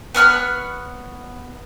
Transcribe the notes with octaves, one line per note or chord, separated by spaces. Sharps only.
B3 C#5 F6 F#6